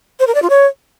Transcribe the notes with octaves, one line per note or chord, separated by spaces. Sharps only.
C5
A#4
D5
F4
C#5